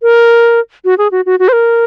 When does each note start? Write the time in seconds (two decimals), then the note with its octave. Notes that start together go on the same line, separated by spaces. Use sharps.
0.02 A#4
0.85 F#4
0.98 G#4
1.12 F#4
1.26 F#4
1.39 F#4
1.48 C5
1.53 A#4